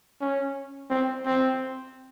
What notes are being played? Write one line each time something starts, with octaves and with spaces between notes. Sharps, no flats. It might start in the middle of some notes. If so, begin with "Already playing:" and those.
C#4
C4
C4